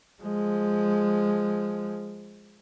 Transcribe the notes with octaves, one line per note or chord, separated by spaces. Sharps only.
F3 G#3